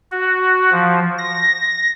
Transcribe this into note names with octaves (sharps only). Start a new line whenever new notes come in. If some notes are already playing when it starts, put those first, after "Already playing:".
F#4
F3
A#6